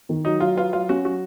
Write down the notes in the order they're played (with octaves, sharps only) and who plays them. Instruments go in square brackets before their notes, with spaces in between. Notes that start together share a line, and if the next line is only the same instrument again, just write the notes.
[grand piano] D#3
[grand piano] F#3 [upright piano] D#4
[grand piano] F#3 [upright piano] F4
[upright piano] F4 [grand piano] B4
[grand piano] F#3 [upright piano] F4
[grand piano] C#4 [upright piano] F#4
[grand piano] F#3 [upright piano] F#4